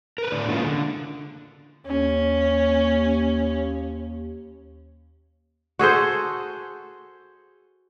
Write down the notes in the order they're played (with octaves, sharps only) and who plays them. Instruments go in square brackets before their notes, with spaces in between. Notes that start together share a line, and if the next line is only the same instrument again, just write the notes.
[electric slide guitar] A#4 B4
A2 D3 D5
E3 G#3 A#3 C#4 E4 F4
D3
[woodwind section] D#2 [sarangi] C#4
[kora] F#4 G#4 A4 C5